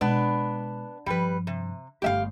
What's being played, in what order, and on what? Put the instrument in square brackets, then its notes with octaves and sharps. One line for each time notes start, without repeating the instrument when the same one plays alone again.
[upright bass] B2 G#3 [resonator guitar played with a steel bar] B3 D4
[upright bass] G2 F3 [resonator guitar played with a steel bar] G3 B4
[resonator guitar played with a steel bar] C3
[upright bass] G1 A3 [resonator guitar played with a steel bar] G4 E5 F5